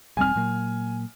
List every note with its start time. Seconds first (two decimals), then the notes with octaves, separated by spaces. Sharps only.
0.17 E1 G3 C4 G#5 F6
0.36 A#2 F#3 A#3